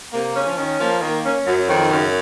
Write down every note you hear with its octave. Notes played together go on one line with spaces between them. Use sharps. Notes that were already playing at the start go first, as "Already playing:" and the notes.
C3 A#3
C#3 C#4
F3
D#3 C#4
F3 A#3
D#3 A#3
C#4
F#2 F#3
F2 D#3
F#2 C#3